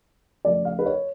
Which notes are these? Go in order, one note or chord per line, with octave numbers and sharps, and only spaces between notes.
C#3 F3 A3 D5
F5
B4
C#5